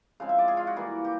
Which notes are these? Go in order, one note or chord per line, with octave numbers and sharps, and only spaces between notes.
C#3 F3 G#3 C4 F5
E5
D5
G#4
F4
F#4
E3 G3 A#3
G4